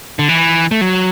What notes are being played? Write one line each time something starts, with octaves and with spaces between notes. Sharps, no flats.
D3
E3
A3
F#3